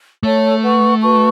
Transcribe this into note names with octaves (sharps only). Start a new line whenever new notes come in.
A3 A4 C#5 A5
B4 F#5 C#6
F#4 B4 A5 C#6